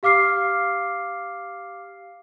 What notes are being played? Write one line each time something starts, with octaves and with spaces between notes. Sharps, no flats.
G4 F5 D6 F6 C7